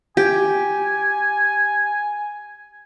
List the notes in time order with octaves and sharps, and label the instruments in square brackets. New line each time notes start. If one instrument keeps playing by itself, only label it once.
[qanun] G4 [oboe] G#5